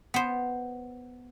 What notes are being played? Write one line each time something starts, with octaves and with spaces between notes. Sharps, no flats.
B3 C5